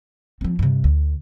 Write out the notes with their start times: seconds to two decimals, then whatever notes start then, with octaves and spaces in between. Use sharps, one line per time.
0.41 F3 C4
0.59 G2 C3
0.84 D2